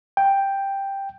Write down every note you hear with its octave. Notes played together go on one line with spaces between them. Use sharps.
G5